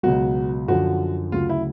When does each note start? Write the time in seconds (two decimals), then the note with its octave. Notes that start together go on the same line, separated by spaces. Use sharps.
0.03 C#2 B2 F#3 F#4
0.68 F#2 D3 F3 F#4
1.32 D2 C#3 F#3 F4
1.49 E4